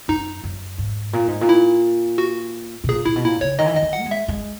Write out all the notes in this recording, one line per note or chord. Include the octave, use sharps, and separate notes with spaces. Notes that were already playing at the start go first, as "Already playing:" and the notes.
F#2 D#4
F#2
G#2
A#2
G#2
A#2
E4
F#4
B2
A#2 G#4
A#2 E4
B2
A#2 E4
C#3 C#5
D#3 D#5
E3
D#3 D#5
E3
F#5
A#3
G#3
E5
G#3